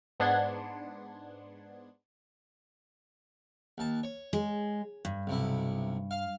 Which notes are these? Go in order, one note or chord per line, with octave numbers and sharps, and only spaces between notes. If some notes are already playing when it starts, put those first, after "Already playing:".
G#2 B3 D4 F#5 C6 G#6
D#2 A5
C#5
G#3
G2
B1 C3 E4
F5